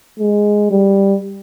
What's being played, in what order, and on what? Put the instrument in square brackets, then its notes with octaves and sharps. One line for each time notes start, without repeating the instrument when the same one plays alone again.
[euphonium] G#3
G3